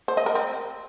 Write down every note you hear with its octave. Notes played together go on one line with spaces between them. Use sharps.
C5
D#5
A#4
C4